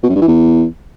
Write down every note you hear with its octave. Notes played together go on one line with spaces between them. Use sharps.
B2
F#2
G2
E3
E2